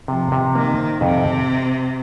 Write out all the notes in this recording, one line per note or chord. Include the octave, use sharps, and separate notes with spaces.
C3 F3
C3
D#3 A#3
C5
F2 C3